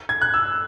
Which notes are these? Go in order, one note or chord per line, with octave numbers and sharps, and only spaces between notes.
G#6
F#6
E6